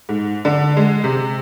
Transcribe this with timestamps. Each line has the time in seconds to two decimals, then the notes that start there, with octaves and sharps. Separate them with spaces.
0.09 G#2
0.45 D3
0.77 G#3
1.04 C3